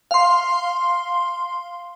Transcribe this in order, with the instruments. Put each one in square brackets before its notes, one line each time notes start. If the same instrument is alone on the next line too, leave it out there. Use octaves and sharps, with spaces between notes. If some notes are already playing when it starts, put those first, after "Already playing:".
[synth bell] F5 C6